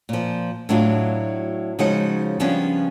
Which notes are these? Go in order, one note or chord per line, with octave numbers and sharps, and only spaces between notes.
A#2 F3
A2 F#3 D4 F4 F#4
C#3 F3 G#3 D#4 F#4 F#5
C#3 F3 G3 B3 C#4 D4